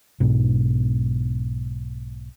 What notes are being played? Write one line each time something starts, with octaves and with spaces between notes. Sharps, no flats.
B1 G#2 B2